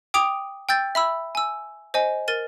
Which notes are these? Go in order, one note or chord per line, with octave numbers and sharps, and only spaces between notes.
G5 D6 D#6 D7 F7
G5 E6 G6 A6
E5 B5 E6
G#5 E6
C5 D#5 G#5
A#4 A6 D#7